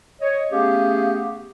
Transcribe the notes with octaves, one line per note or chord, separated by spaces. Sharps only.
C#5 D#5
A3 B3 C#4 G4 G#4 F5